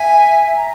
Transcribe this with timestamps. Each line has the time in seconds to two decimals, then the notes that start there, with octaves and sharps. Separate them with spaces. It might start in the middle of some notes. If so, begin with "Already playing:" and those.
Already playing: E5 G#5
0.49 G#5
0.56 A#5